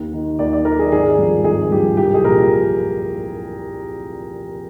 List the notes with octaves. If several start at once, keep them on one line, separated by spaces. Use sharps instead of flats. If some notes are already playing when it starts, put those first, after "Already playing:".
Already playing: D#2
D#3
D#2 D5
D5
D#3 A#4
G#4
G#1 G#4
G2 F3
G#1 G#4
G2 F3 G4
C2 G4
G#4
A#2 F3 A#4